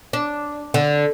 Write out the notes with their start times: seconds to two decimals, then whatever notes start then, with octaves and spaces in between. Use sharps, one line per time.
0.13 D4
0.74 D3